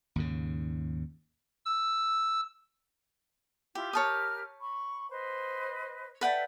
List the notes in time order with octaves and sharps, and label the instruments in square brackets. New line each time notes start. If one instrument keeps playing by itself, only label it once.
[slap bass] D#2 G#2 C#3
[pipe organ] E6
[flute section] E4 F4 [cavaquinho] G4
[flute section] G4 A#4 F6 [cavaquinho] C#5 A5 D#6
[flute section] B5 C#6
B4 C5 D#5
[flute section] A4 D5 E5 [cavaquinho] B4 F#5 G5